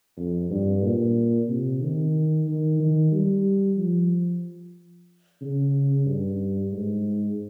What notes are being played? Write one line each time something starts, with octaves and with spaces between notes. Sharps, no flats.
F2
G2
A#2
C3
D#3
D#3
D#3
G3
F3
C#3
G2
G#2